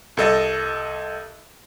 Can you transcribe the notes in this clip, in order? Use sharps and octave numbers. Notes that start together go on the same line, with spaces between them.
C2 A4 D#5 A6